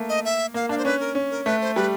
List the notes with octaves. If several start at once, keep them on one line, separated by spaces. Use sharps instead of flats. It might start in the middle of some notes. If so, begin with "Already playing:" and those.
Already playing: A3 A#3
D#5
E5
A#3 F5
D4 F5
C5
C#4 B4
A#4
C#4
A#4
A3 B4
C5
G3 B4